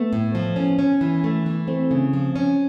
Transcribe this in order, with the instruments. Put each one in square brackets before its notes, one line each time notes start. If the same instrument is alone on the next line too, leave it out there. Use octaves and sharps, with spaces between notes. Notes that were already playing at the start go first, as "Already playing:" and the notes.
Already playing: [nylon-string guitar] A3 [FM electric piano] B3
[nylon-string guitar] A2
F3
C#4
C#4
E3
A3
E3
[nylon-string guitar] A3 [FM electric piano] C4
[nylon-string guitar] C#3
F3
C#4